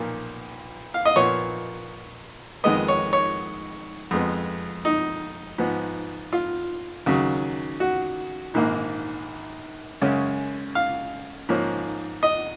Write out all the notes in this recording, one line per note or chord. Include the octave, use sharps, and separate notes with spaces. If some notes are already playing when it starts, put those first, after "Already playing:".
Already playing: B1 A#2 F3 A#3
F5
D#5
A#2 F3 B3 C#5
F2 D#3 G#3 B3 D#5
C#5
C#5
F2 F3 G#3 B3
D#4
G#2 F3 B3
F4
D#2 C#3 F#3
F#4
A#1 G#2 D#3 A#3
F#2 C#3 G#3 C#4
F5
G#2 F3 A#3 C#4
D#5